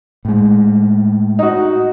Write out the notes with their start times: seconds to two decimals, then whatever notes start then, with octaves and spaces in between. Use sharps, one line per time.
0.25 A2 G#3
1.39 D#4 F#4